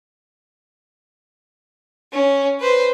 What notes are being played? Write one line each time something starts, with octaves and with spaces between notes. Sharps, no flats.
C#4
B4 C5